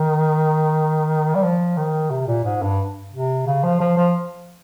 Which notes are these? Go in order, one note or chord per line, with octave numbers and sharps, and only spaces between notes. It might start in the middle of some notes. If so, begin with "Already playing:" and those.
Already playing: D#3
G3
F3
D#3
C3
A#2
G#2
G2
C3
C#3
F3
F3
F3